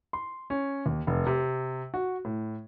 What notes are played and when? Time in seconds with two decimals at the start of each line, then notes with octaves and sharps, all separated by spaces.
0.13 C6
0.50 C#4
0.86 D#2
1.07 F1
1.26 C3
1.94 F#4
2.25 A2